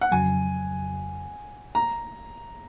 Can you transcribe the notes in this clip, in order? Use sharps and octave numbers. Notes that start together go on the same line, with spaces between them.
F#5
F2 C#3 F#3 G#5
A#5